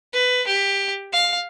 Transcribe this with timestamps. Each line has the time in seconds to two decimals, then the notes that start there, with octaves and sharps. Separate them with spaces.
0.14 B4
0.47 G4
1.13 F5